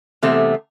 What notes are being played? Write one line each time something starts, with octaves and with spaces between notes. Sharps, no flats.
E2 C3 A3